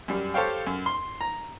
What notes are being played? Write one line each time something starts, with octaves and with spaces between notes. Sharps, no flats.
F#2 G3
G4 A4 C5 C#5 F5 G5
F#2
C6
A#5